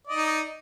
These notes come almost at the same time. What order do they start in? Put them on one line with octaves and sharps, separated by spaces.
D5 D#5 D#4